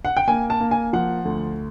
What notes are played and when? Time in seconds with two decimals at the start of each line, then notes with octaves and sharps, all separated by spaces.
0.05 F#5
0.17 G5
0.28 A#3 G#5
0.50 A5
0.60 A#3
0.71 G#5
0.93 F3 F#5
1.25 D2